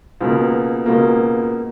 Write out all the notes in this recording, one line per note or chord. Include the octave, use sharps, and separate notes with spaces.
C#2 B2 A#3
C#2 B2 A#3